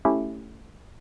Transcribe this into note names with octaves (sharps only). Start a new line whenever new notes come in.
A3 C#4 E4 G4